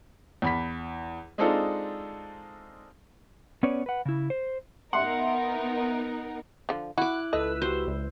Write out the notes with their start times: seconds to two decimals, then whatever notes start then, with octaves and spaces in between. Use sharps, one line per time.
0.42 E2 B5 B6
1.38 G#3 C4 D4 D#4 F4 A4
3.63 B3 C#4 B4 C#5 D5
3.86 B4 F#5
4.05 C#3 E4
4.30 C5
4.93 B3 D#4 A#4 E5 F#5 C6
6.69 D3 F3
6.98 E4 F#4 D6 F#6
7.33 C#2 A4 B4 D#5 E6
7.62 F#4 G4 C5
7.87 C#2